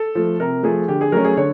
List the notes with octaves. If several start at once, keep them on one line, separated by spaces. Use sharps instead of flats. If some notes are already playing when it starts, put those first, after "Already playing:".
Already playing: A4
F3 A3
C3 A#4
F3 A3 G#4
D3 G4
G#4
F#3 A3 C#4 A#4
G#4
D3 C#5